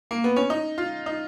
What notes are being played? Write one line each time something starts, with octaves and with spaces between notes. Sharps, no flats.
A#3
B3
C#4
D#4
F4
D#4